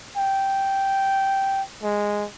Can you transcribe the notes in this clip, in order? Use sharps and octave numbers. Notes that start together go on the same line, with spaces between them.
G5
G#3